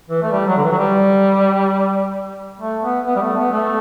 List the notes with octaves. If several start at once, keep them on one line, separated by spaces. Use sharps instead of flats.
E3
A3
G3
F#3
D3
E3
F#3
G3
A3
B3
B3
G3
A3
B3
A3